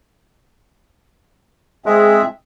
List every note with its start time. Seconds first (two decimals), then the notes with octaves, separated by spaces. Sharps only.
1.86 G#3 C4 G#4 E5